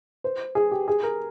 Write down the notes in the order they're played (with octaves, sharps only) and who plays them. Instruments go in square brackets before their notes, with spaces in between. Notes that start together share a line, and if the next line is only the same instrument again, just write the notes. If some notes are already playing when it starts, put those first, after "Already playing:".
[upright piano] C5
G#4
G4
G#4
A#4